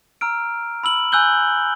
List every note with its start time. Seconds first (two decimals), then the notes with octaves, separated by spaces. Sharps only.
0.21 A#5 E6 F6 D7
0.84 B5 E6 F#7
1.12 G#5 E6 F#6 G6 G7